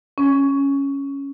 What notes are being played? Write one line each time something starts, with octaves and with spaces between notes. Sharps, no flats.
C#4